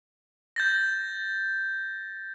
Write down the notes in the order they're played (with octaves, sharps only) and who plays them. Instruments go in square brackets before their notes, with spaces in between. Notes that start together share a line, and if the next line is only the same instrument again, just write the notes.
[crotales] G6 A6 A#6